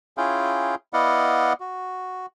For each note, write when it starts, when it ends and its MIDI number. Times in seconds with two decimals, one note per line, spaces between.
0.17 0.75 61
0.17 0.75 64
0.17 0.75 65
0.17 0.75 68
0.17 0.75 77
0.17 0.75 79
0.93 1.53 59
0.93 1.53 64
0.93 1.53 74
0.93 1.53 75
0.93 1.53 77
0.93 1.53 78
1.60 2.26 66